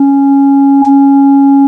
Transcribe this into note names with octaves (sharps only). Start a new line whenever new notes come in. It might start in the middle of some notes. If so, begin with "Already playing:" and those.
Already playing: C#4
C#4